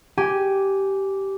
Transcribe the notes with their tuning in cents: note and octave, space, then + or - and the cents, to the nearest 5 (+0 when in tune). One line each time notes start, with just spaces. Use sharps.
G4 -10 G#5 +0